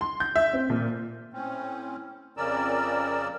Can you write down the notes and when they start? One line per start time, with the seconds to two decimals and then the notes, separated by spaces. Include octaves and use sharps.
0.01 C6
0.20 G6
0.36 E5
0.53 C4
0.70 A#2
1.33 A2 C4 C#4
2.37 F2 C#3 C#4 A#4 D5 E6